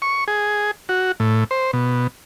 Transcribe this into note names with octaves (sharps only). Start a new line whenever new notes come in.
C#6
G#4
F#4
A2
C5
B2